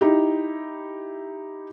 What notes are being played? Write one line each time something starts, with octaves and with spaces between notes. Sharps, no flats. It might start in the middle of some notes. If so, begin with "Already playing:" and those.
D#4 E4 G4